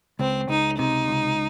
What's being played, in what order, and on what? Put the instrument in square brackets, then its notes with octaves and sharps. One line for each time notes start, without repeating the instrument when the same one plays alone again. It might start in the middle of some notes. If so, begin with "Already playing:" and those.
[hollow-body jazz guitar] C#2 [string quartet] C4
[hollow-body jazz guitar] C#2 [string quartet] D#4
[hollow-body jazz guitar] C3 [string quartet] D#4
[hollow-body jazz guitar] C#2